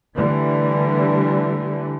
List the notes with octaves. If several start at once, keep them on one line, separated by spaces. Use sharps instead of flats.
D3 E3 G3 A3